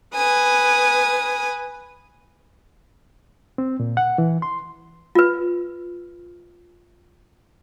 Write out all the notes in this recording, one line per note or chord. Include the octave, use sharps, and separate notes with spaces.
B4 G#5 D#6
C4
A#2
F#5
E3
C6
F4 B4